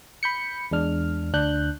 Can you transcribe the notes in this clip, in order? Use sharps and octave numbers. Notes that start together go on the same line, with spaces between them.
B5 G6 C#7
E2 G#3 D4 F6
D2 D4 F#6 G6